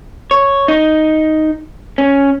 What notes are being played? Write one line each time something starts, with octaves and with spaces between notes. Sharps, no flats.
C#5
D#4
C#4